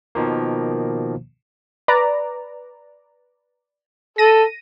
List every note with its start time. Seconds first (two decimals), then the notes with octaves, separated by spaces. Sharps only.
0.15 B2 D#3 F3 A#3
1.88 B4 D5 A#5
4.18 A4 A#6 D#7